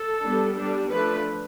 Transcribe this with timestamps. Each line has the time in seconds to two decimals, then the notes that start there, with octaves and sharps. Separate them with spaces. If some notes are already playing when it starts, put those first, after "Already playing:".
Already playing: A4
0.22 G3 B3 D4
0.56 G3 D4
0.90 F3 A3 D4 B4